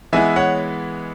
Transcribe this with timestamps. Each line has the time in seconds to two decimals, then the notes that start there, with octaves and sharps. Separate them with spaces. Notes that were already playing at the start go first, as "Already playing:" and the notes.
0.13 E3 G#3 B3 E4 E5 G#5
0.36 C#5 F#5